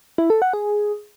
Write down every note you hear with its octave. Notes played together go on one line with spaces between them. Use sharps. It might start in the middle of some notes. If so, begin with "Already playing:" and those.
E4
A4
F#5
G#4